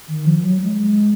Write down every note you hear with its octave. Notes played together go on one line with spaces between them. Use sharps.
D#3
F3
F#3
G#3